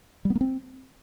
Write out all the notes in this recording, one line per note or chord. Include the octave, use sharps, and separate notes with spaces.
G3
B3
A#3
C4